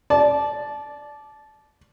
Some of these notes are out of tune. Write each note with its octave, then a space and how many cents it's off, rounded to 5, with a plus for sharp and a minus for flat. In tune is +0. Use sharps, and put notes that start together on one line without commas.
D5 +0 A5 -25